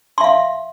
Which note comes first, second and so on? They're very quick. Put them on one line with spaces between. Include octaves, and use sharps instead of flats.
C6 E5 F5